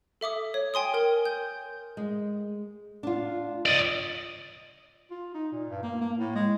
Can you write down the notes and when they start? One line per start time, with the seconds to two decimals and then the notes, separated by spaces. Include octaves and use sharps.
0.21 A4 E5 D6 D#6
0.54 C#5
0.74 G5 G#5 C6 D#6
0.94 A#4 G5
1.25 G6
1.97 G#3
3.03 D4 F4
3.66 D5 D#5
5.11 F4
5.35 D#4
5.52 A#2
5.70 G2
5.83 A#3
6.01 A#3
6.18 A2
6.35 G#3